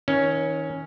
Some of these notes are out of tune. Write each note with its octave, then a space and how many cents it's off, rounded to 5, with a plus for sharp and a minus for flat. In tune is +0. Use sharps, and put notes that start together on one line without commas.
D#3 +40 C#4 +0